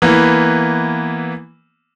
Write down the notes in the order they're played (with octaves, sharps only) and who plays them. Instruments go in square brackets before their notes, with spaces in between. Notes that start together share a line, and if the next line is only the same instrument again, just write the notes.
[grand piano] E3 A#3 B3